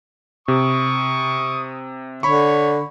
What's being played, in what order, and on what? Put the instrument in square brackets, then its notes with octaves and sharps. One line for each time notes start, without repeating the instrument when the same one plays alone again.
[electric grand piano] C3 [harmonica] C#6 D#6
[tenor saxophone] D3 [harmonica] C#5 [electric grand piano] B5 C#6